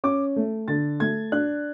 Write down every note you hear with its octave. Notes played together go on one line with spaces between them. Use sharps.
C#4 D6
A3
D3 A6
A3 G#6
D4 F#6